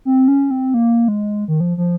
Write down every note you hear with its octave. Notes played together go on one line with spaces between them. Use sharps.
C4
C#4
C4
A#3
G#3
D#3
F3
F3